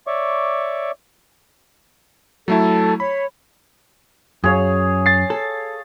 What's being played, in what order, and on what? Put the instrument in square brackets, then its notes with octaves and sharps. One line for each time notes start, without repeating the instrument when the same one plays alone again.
[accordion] C#5 D5 E5 C#6 D6
[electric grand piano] F#3 A3 E4 [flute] A4
[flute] C#5 [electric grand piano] B5
[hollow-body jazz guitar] F#2 [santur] G#4 C#5 F5
[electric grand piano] A6 C7
[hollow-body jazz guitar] A4